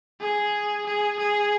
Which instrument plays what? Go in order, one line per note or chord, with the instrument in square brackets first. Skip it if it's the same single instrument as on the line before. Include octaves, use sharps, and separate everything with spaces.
[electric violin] G#4
G#4
G#4